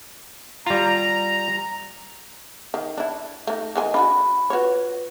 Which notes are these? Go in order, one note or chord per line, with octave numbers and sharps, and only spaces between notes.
G3 F4 A#5
D#3
D4 E4
A3 D#4
D#3 G#3 G#5
D4 F4 F#4 B5
F4 F#4 B4 C#5